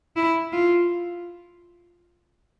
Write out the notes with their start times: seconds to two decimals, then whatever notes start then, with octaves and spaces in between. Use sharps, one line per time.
0.17 E4
0.53 F4